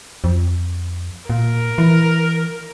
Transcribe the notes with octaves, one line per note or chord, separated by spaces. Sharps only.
F2
A#2 A#4
E3